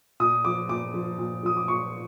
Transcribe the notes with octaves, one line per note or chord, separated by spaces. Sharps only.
A#2 D#6
F3 D6
A#2 D6
F3
A#2
F3 D#6
D6
A#2 C#6